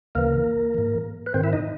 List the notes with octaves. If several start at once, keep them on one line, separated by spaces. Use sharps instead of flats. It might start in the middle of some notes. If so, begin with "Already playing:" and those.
D2 C#3 E3 A#3 A#4
G#2 E3
B4
G#2 D#3 C4 C5
E4 E5
D#4 D#5